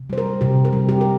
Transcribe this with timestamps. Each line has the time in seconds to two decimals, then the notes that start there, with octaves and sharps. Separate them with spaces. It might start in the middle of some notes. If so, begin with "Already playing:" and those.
Already playing: C3
0.10 G3 C5
0.18 A#4
0.41 C3 G4
0.65 A#4
0.73 G3
0.89 G4
1.01 A#4